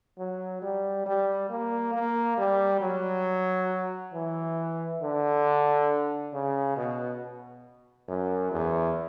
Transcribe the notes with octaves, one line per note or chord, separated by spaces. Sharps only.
F#3
G3
G3
A#3
A#3
G3
F#3
E3
D3
C#3
B2
F#2
E2